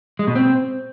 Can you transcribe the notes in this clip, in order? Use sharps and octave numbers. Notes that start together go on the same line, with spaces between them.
G#3
B2
C4